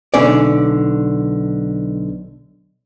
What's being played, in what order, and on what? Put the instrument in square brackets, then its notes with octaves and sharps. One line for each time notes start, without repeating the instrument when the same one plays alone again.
[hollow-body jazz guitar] B1 D3 C#4 D5